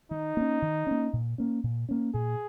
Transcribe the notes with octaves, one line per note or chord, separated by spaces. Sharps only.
D#3 D#4
A#3 C#4
D#3
A#3 C#4
A#2
A#3 C#4
A#2
A#3 C#4
A#2 G#4